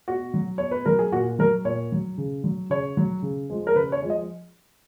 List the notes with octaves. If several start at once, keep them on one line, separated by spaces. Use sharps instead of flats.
B2 F#4
F#3
B2 C#5
B4
F#3 A#4
G#4
A#2 F#4
F#3 A#4
A#2 C#5
F#3
C#3
F#3
C#3 C#5
F#3
C#3
F3 G#3
A#4
C#3 B4
C#5
F3 G#3
D#5